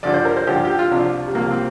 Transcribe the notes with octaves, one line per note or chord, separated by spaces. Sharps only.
G2 D3 F3 D5
C5
A#4
C5
G2 D3 F3 G4
G4
F4
C2 C3 F3 D4
G3
C2 C3 F3 A#3
C4